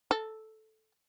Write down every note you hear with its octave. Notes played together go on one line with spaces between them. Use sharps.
A4